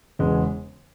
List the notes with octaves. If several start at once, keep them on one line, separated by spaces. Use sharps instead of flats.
E1 E2 C#3 G#3 B3